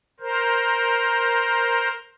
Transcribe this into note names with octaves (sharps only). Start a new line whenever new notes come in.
A#4 C5